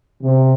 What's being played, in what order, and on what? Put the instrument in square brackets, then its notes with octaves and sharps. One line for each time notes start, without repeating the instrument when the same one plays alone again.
[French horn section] C3